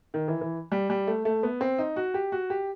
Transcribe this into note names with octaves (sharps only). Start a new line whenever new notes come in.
D#3
E3
E3
G3
G3
A3
A3
B3
C4
D#4
F#4
G4
F#4
G4